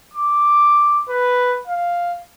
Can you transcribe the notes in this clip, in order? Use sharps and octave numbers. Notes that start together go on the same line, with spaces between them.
D6
B4
F5